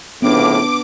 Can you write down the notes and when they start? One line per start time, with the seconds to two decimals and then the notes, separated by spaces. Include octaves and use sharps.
0.22 F2 A2 C#3 B3 D4 D6